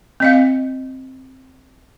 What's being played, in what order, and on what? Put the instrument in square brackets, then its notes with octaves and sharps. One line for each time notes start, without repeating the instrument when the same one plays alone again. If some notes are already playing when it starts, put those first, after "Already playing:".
[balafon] C4 D#5 F5